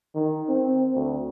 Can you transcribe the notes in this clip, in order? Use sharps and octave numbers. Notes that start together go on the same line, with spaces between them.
D#3
C4
D2